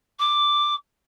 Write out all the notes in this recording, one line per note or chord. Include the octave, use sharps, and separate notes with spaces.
D6